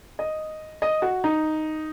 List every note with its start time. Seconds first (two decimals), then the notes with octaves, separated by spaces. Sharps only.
0.19 D#5
0.82 D#5
1.02 F#4
1.24 D#4